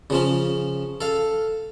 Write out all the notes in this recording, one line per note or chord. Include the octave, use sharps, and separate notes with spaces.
C#3 F3 C#4
A4 F5